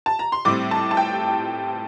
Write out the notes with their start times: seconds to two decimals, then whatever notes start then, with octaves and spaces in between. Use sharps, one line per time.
0.06 A5
0.19 A#5
0.32 C6
0.45 A2 G3 C4 D6
0.71 A5
0.91 A5
0.97 G5